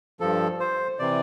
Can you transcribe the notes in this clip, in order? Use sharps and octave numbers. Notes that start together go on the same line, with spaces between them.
G2 F3 A4
C5
C3 E3 D5